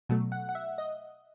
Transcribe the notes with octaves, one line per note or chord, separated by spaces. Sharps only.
B2 F#3 A3
F#5
F#5
E5
D#5